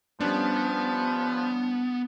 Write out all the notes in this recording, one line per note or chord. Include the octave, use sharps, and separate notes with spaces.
F3 G3 B3 C#4 D4